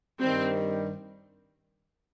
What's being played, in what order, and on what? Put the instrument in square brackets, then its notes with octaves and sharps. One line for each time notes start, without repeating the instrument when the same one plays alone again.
[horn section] G2 D#3 G3 [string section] C4